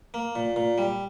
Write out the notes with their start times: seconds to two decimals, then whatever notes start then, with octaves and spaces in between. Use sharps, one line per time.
0.14 A#3
0.35 A#2
0.56 A#2
0.78 G3